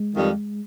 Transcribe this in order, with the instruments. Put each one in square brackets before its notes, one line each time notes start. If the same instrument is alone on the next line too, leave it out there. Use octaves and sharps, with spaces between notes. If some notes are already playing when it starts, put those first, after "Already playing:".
Already playing: [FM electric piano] G#3
[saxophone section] F2 D#3 G3